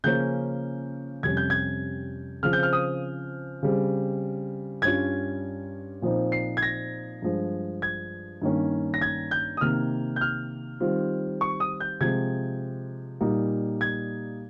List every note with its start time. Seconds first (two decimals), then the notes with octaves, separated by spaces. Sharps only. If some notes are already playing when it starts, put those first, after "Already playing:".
0.04 C#3 F3 A#3 C#4 G6
1.23 F2 C3 G3 C#4 G#6
1.37 G6
1.50 G#6
2.43 C#3 F3 C4 F6
2.53 G6
2.63 F6
2.73 D#6
3.63 C#3 G3 C4
4.82 G2 G3 C#4 F4 G#6
6.02 A#2 F3 C4 D#4
6.32 C7
6.57 G#6
6.63 A#6
7.22 G2 F3 G#3
7.82 G#6
8.42 G2 D#3 A#3 C#4
8.94 A#6
9.01 G#6
9.31 G6
9.57 D#6
9.61 C3 D#3 A#3 F6
10.16 G6
10.21 F6
10.80 D#3 G3 C4 F4
11.41 C#6
11.60 D#6
11.80 G6
12.01 C3 F3 G#3 G#6
13.21 A#2 G3 A#3 D#4
13.81 G#6